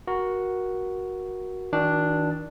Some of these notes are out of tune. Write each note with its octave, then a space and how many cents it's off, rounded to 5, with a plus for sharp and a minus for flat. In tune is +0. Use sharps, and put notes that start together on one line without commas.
F#4 +0 A#4 +20
D#3 +35 D4 +0 F#4 +0